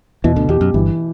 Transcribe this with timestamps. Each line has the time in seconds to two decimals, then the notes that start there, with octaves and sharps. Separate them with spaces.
0.24 E2 B2 E3
0.36 D2 D3
0.49 E2 G4
0.61 F#2
0.74 G1 G2 E3